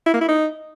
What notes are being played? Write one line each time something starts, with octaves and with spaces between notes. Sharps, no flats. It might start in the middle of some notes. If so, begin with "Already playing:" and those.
E4
A#3
E4
D#4